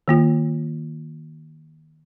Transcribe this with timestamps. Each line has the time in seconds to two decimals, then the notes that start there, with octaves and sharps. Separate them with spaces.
0.08 D#3 A#3 F4